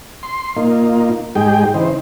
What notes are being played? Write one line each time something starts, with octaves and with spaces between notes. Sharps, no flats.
C6
A#2 A#3 D#4 F4
G#2 G#3 D#4 G4 G#4 G5
C#3 E3 D#4 C5